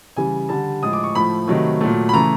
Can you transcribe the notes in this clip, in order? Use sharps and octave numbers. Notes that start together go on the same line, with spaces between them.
C#3 E3 G3 G#5
D3 G3 A5
A2 F3 G#3 D#6
D6
C#6
A2 F3 A3 B5
C3 D#3 F#3 A3
A#2 F#3 A3
B5
C#3 E3 A3 A#5